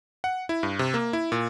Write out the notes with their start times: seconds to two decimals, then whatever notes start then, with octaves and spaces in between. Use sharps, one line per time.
0.24 F#5
0.49 E4
0.63 G2
0.79 C3
0.94 A#3
1.13 E4
1.32 A#2